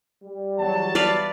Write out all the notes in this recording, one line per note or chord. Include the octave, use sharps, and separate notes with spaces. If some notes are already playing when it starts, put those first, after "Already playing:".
G3
E2 F#3 A5
B4 D5 F5